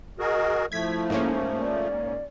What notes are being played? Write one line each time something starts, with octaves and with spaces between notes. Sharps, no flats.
F#4 G#4 A#4 D#5
F3 A3 E4 G#6 B6
G#2 A#3 C#4
D5